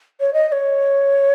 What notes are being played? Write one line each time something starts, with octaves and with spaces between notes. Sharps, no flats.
C#5
D#5
D#5
C#5